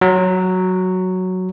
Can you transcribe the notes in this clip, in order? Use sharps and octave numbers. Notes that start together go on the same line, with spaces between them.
F#3